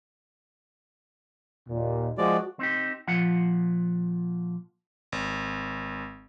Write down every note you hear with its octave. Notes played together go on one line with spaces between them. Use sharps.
D#2 A#2
F3 G#3 F#4 D5
C4 D#4 G4
A#2 F3 F4 F#5
G#1